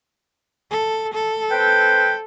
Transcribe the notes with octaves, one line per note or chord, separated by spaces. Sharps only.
A4
A4
C4 B4 G5